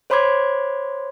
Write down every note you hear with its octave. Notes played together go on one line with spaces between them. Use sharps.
C5 C#5 B5 C6 D6 G#6